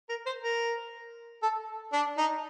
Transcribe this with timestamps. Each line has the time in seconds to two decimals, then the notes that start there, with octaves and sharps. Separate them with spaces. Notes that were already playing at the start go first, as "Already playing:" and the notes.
0.09 A#4
0.26 C5
0.43 A#4
1.43 A4
1.93 D4
2.18 D#4